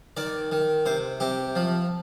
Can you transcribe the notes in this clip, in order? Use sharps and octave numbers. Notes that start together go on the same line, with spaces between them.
D#3 D5
D#3
C3 C5
C3 G4
F3